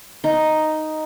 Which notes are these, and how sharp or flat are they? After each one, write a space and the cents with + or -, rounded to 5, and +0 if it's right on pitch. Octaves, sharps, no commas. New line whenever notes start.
D#4 +0